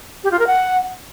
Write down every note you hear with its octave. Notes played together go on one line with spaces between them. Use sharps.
G4
F4
A#4
F#5